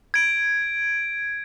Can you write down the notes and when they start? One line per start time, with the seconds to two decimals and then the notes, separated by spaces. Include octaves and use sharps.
0.14 G#6 D7